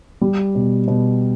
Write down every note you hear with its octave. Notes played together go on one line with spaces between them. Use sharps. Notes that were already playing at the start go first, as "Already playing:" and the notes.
G3
B2
B2